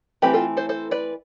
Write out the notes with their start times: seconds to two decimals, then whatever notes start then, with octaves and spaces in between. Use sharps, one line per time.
0.22 E3 A3 C4 G4 B4
0.34 F4 A4
0.57 A4 C5
0.69 A4 C5
0.91 B4 D5